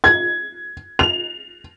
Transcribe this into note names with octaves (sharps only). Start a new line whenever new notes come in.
G#6
F7